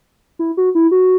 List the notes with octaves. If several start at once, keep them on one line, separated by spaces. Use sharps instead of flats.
E4
F#4
E4
F#4